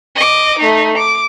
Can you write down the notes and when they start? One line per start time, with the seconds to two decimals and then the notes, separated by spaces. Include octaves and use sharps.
0.16 D#5 D6
0.59 A3 D#4
0.97 D6